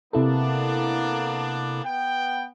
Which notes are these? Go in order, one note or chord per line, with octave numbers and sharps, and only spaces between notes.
C3 A#3 B3 D4 E4 A4
B3 G5